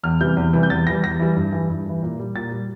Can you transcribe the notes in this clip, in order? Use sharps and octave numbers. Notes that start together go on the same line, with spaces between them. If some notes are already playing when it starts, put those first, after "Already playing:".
E2 F6
C3 E3 G3 G6
E2
C3 E3 G3
G6
E2 A6
E3 G3 A#6
E2 A#6
E3 G3
G2
E3 G3
G2
E3 G3
A#2
G3
A#2 A6
G3